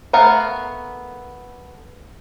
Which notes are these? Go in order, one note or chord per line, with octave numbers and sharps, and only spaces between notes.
A3 B3 A#4 F5 F#5